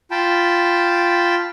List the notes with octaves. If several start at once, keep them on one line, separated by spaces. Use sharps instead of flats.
F4 G5 A5 B5